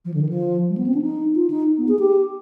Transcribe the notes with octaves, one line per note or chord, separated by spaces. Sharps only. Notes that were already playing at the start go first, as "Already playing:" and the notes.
F3
D3
D#3
F3
G3
B3
C4
D4
D#4
F4
D#4
B3
G#4
G4